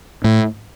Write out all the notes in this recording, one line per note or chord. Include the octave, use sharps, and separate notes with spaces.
A2